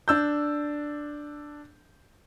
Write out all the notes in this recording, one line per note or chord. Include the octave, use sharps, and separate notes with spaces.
D4 E6 G6